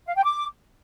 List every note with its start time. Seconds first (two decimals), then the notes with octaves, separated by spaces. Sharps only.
0.07 F5
0.16 G5
0.25 D6